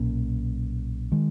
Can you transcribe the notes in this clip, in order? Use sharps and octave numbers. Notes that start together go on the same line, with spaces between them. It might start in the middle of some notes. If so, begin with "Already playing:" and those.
Already playing: B1 A#2 A#3 C#4
D#3 G#3